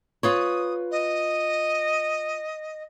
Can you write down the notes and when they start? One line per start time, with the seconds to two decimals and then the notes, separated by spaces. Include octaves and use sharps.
0.23 F4 B4 C#5 D#6
0.91 D#5